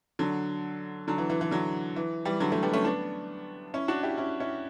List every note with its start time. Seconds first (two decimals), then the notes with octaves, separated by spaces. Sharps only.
0.19 D3 F#3
1.08 D3 F#3
1.18 E3
1.30 E3
1.41 E3
1.51 D3 F#3
1.96 E3
2.25 E3 G3
2.40 D3 F#3
2.52 F#3 A3
2.62 G3 B3
2.73 A3 C#4
2.85 B3 D4
3.74 C#4 E4
3.88 D4 F#4
4.03 E4 G4
4.18 C#4 E4
4.40 C#4 E4